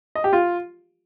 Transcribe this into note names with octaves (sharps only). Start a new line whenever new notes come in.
D#5
G4
F4